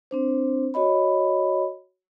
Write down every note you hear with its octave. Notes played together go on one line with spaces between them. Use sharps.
C4 D4 C5
F#4 C#5 D#5 B5